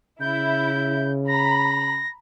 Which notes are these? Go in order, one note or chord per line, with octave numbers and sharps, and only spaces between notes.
C#3 E4 G6
A#5 B5 A#6